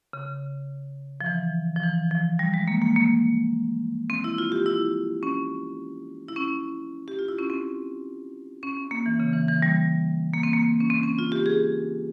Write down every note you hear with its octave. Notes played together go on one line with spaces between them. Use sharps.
C#3
F3
E3
F3
E3
F3
G3
G#3
A#3
A#3
A#3
C4
E4
F4
G4
E4
C#4
E4
C#4
G4
F4
E4
C#4
C4
C#4
C4
A#3
E3
C#3
E3
E3
G3
A#3
C4
A#3
C#4
C4
C#4
F4
G4
G#4